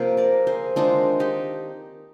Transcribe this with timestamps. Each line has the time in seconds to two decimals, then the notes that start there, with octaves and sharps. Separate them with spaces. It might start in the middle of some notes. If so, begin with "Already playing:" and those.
Already playing: C3 F3 A#3 F4 G4
0.17 A#4 D5
0.47 G#4 C5
0.76 D#3 G#3 C4 D4 F4
1.20 D#4 G4